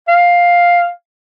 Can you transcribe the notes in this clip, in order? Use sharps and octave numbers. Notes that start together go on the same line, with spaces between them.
F5